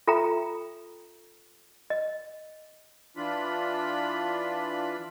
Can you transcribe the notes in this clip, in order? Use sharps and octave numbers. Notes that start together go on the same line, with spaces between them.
F4 A4 E5 G5 A#5
D#5
E3 D4 F4 B5